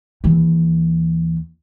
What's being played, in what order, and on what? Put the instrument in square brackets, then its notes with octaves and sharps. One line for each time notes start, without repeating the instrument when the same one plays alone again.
[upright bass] D#2 E3